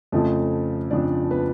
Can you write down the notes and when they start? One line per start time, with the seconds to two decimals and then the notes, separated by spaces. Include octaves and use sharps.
0.12 F2 C#3 F3 A3 A4
0.91 F2 C#3 F3 D4 D5
1.31 B3 B4